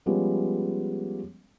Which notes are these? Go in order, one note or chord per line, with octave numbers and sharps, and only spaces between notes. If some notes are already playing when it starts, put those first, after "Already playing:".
F3 G3 G#3 B3 C#4